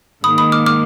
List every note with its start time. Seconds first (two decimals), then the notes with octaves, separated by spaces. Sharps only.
0.24 G#2 D#3 A#3 B5 D#6
0.38 B5 D#6
0.52 D6 F6
0.66 D6 F6